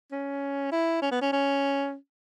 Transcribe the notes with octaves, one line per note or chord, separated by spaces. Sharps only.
C#4
E4
C#4
B3
C#4
C#4